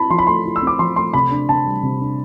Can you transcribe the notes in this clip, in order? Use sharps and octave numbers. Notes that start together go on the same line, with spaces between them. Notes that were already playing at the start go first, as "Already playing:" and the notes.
Already playing: C4 E4 A5 B5
F3 C6
B5
A3 C6
E4
E6
C4
D6
F3 C6
A3 C6
C3 B5
D4
C3 A5
G3
C3
D4